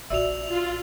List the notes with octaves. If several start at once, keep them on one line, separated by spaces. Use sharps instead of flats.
A#1 F#4 D5 E5 E6 F7
F4 F7